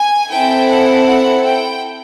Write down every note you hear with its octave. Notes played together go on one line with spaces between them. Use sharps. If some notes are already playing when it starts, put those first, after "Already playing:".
Already playing: G#5
C4 E4 A4 G5
F#5
F#5
G5